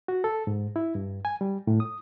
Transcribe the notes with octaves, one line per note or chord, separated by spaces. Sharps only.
F#4
A4
G#2
E4
G2
G#5
G3
A2
D#6